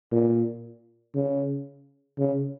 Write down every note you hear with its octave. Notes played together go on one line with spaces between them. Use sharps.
A#2
C#3
C#3